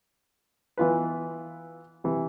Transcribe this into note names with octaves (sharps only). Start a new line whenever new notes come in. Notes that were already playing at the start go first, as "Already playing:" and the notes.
E3 B3 F4 B4
C3 E3